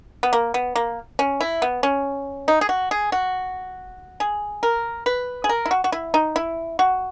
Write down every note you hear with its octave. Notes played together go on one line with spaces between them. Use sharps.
B3
A#3
B3
A#3
C#4
E4
B3
C#4
D#4
G#4
F#4
G#4
F#4
G#4
A#4
B4
G#4
A#4
E4
F#4
F#4
E4
D#4
E4
F#4